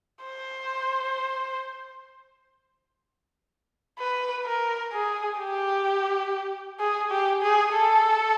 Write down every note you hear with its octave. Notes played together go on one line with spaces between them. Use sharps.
C5
B4
A#4
G#4
G4
G#4
G4
G#4
A4